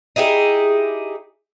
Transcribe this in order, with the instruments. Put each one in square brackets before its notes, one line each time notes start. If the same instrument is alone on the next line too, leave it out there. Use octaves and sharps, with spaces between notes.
[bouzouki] D#4 E4 G4 G#4